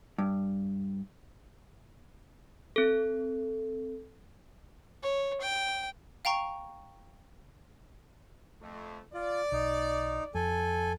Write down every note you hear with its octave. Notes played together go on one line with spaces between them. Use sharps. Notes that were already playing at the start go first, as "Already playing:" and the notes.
G2
C4 A4
C#5
G5
F5 G5 A#5 C#6
F2 A3
F4 D5
B1 D#4
F2 A4 G#5